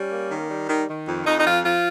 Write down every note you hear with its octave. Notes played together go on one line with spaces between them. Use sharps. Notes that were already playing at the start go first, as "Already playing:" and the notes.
Already playing: G3 C#4
A#3
D#3
G3
D#3
D#3
F2
F2 D#4
D#4
F3 F4
F3 F4